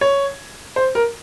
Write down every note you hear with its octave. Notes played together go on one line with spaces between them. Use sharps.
C#5
C5
A#4